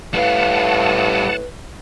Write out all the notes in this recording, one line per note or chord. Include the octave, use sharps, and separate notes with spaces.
A2 G3 B4 F5 F#5 A5